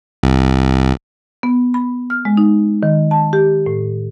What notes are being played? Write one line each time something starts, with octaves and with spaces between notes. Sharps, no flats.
C2
B3
B5
F6
G#3
D#4
D#3
A5
G4
A2